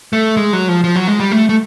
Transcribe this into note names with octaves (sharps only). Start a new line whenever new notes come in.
A3
G#3
F#3
F3
F3
F#3
G#3
G3
A3
A3